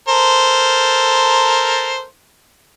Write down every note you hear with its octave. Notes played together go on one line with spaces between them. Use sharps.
A4 A#4 C5